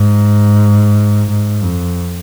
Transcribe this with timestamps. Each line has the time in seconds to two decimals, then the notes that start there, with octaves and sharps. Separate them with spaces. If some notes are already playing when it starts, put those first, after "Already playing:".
Already playing: G#2
1.29 G#2
1.64 F2